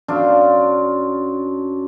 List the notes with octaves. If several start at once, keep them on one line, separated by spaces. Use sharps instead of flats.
F#2 D4 C5 F5